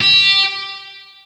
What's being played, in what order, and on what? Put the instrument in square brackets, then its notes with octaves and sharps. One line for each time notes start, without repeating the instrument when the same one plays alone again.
[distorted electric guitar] G4